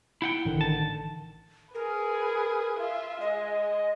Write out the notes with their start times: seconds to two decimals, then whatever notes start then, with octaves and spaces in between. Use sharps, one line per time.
0.22 E4 F#5 G5
0.45 A1 D3 D#3
0.61 A5
1.75 G#4 A#4 B4
2.79 F4 E5
3.21 G#3 D#5